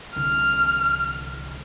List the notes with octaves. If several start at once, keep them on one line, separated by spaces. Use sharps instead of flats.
C2 D3 E3 F6